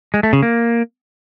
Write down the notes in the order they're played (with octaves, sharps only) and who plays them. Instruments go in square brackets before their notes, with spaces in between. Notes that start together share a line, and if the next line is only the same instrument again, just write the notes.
[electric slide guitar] G#3
A3
C#3
A#3